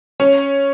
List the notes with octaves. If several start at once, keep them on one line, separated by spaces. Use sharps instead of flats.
C#4